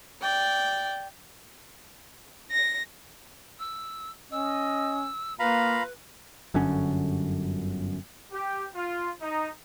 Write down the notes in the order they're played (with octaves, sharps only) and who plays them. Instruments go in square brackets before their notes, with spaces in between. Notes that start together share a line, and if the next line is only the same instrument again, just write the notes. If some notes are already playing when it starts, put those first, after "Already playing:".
[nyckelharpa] D5 G5
[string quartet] A#6
[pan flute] E6
[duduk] C#4 [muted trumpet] D#5 [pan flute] E6
[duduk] A#3 [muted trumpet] F4 [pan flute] B4 [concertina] F5 A#5 B5
[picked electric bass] G1 F#2 D3 C#4
[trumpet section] G4
F4
D#4